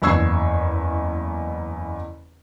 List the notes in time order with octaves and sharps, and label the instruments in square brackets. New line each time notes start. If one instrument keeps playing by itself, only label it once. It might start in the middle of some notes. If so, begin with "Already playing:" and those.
[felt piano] F#1 E2 C#6 E6 G#6 C7